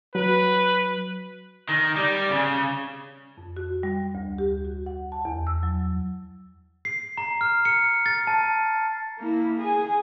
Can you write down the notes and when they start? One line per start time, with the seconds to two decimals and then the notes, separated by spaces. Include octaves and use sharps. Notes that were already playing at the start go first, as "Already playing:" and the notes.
0.15 F#3 B4
1.69 D#3
1.96 G3
2.30 C#3
3.38 F2
3.57 F#4
3.83 G3
4.15 D2
4.38 G4
4.65 F#4
4.86 F#5
5.12 A5
5.25 E2
5.47 E6
5.63 F#3
6.85 C7
7.17 A#5
7.41 F6
7.65 C#7
8.06 A6
8.27 A5
9.19 A#3 E4
9.58 G#4 G#5